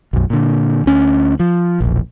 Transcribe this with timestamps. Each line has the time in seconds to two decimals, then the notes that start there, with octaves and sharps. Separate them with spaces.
0.13 B1 F#2
0.30 A#2 D3
0.86 D2 C#4
1.40 F3
1.80 E1 A#1